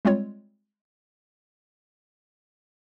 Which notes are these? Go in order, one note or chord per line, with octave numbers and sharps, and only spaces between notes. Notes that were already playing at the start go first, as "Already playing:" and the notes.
G3 G#3 C4 F4 C#5